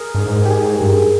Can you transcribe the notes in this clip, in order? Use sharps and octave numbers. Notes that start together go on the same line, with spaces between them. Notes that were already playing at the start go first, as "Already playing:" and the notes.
Already playing: G#4 A#4
G2
G#2 G#4
G4
G#4
G2